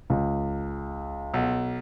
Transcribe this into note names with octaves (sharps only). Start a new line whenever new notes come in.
C#2
B1